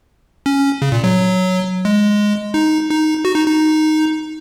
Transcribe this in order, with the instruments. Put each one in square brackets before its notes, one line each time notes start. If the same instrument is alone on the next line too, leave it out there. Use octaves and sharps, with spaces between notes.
[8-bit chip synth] C#4
C#3
A#2
F#3
G#3
D#4
D#4
F#4
D#4
D#4